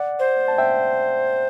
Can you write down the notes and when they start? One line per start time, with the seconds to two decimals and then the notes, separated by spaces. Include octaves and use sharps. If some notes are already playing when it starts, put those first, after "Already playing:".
Already playing: D5 F#5
0.19 C5
0.48 A5
0.58 E5 G5